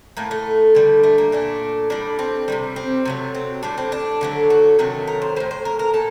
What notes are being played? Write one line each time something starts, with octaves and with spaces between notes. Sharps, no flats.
A2 A3 A#3
A3
D3 G3
A3
A#3
A#2 A3 D4
A2 G3 D4
C4
C3 D#3 G3
C4
C3 F#3 A3
C4
A2 G3 D4
C4
D4
D3 F#3 A3
F#4
C3 D#3 F#3 A3
A#4
C5
A2 G3 C5
C5
A#4
A#4
A#2 A4